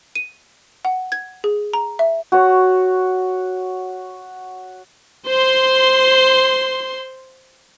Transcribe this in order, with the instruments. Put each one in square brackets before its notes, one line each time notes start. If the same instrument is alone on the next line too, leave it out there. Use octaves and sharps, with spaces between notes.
[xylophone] D#7
F#5
G#6
G#4
A#5
E5
[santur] F#4 C#5
[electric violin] C5 C6